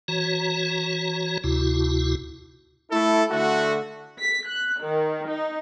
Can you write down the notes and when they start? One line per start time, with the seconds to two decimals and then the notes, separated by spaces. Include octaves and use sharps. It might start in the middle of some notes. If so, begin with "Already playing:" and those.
0.08 E3 F#4 C#5 A#5
1.44 D2 C3 E4 F#4
2.91 A3 E4 A4
3.30 D3 A3 F#4
4.18 B6
4.48 F#6
4.81 D#3
5.27 D#4